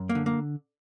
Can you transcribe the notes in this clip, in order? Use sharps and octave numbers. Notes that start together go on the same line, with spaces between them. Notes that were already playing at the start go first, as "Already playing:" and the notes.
Already playing: F#2
A#3
D3
A#3